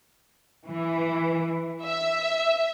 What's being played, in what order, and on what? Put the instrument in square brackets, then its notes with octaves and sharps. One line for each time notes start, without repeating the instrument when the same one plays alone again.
[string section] E3
E5